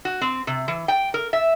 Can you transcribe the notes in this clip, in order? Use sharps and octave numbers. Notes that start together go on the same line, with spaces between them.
F#4
C4
C3
E3
G5
A#4
E5